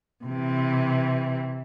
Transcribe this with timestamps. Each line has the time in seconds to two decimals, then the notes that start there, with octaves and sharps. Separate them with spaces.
0.24 C3 E3